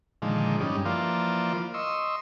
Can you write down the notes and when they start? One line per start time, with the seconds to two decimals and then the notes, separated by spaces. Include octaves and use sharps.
0.22 A#2 D3 D#3 F3 G#3
0.61 G2 G3 C#4 D#4
0.85 E3 F3 A#3 F4 D5
1.74 D#5 C6 C#6 E6